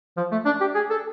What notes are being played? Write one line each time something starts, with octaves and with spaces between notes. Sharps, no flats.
F3
A3
D4
G4
G#4
A4